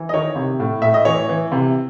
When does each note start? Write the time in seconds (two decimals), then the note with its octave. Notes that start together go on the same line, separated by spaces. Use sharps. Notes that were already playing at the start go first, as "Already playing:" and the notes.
Already playing: E3
0.09 D#5
0.14 D#3 C#5
0.36 C3
0.60 A2
0.82 A2 E5
0.94 D#5
1.05 E3 C#5
1.29 E3
1.52 C3